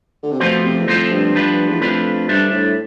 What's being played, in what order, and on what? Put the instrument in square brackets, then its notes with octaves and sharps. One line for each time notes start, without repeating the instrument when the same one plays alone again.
[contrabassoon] D3
C3
[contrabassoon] B2 [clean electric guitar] F3 A3 C4 F4 C5
[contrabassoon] C3
E2
[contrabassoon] F2 [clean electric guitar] F3 A3 C4 F4 C5
[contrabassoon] G2
[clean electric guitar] F3 A3 D4 F4 B4
[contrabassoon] E2
[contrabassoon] F2 [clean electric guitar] F3 A3 D4 F4 B4
[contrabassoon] G2 [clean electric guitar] G3 D4 A4 C5 E5
[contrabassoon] A2